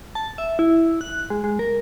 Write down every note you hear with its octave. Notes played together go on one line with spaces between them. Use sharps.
A5
E5
E4
F#6
G#3
G#3
A#4